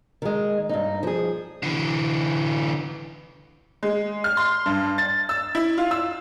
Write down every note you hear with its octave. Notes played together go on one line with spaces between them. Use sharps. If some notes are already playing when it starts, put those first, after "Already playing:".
D#3 G#3
G2 D#4
F3 G#4
D3 E3
G#3
F6
C6
G2
A6
E6
E4
F4
E6